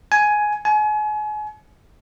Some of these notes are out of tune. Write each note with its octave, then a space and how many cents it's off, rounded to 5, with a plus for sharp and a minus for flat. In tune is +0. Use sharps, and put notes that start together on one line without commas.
G#5 +10
G#5 +35